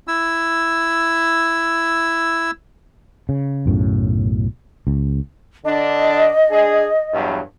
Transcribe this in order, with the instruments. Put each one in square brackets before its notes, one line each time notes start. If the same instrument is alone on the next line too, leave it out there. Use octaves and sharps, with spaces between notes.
[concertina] E4 E6
[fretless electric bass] C#3
B1 F#2 A2 C#3
C#2
[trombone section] D3 D4 [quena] D#5
[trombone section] D4 G#4
E2 G2 F#3